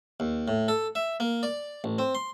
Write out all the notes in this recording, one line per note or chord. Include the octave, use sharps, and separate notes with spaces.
D#2
A2
A4
E5
A#3
D5
A1
C4
C6